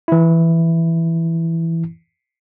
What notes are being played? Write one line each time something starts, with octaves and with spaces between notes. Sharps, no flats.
E3 E4